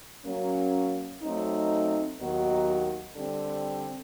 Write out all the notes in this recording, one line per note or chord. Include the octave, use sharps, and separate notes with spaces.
F#3 A#3 C#4
F#3 A3 C4 D#4
D#2 D#3 F#3 B3 D#4
D3 G3 C4